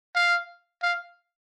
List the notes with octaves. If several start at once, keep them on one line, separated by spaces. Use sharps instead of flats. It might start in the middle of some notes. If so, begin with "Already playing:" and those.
F5
F5